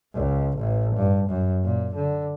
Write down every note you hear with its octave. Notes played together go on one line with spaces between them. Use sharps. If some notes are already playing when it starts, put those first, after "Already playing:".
C#2
A1
G2
F#2
A#2
D3